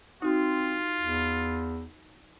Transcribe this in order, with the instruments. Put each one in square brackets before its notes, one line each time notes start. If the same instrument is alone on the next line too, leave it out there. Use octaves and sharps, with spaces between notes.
[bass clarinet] C4 [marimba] D#4 F#4 [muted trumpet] F4
[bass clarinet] E2